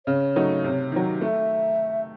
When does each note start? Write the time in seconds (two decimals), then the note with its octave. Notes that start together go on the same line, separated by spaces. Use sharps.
0.06 C#3 C#5
0.36 F#3 A3 D#4
0.64 C3
0.92 D#3 F#3
1.21 A3 E5